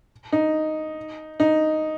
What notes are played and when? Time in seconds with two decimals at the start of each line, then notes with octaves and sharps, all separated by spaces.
0.32 D#4
1.40 D#4